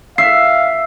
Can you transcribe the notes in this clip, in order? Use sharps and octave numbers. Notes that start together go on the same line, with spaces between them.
E5 F5 C7